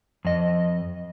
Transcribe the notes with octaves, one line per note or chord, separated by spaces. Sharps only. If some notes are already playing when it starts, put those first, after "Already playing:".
F2 D#5